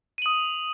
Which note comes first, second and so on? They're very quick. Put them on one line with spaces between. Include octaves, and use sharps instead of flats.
D#7 F#7 D#6